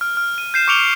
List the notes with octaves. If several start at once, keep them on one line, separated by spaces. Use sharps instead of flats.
F6
F6
D#7
G6 C7 E7
C#6 D6 C#7 D7 F7 G7